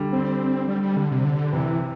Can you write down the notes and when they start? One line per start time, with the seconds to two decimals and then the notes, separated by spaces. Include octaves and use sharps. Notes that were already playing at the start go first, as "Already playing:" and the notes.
Already playing: D3 G3
0.12 C4
0.68 G3
0.82 G3
0.97 D3
1.11 C3
1.25 D3
1.52 C3 E3